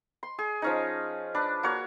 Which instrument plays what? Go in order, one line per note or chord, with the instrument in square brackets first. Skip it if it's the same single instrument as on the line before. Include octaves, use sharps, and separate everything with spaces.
[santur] C6
G#4
F3 C#4 D#4
D4 B4
A#3 F#4 C#5